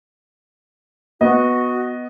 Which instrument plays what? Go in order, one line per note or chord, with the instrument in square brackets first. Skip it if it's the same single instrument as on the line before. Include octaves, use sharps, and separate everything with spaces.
[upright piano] B3 D#5 [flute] F#4